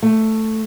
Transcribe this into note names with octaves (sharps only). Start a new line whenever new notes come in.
A3